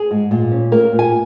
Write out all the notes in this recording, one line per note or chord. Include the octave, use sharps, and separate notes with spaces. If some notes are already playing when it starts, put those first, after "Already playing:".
Already playing: G#4
G#2
A#2
C#4
A#3 A#4
A#2
G#5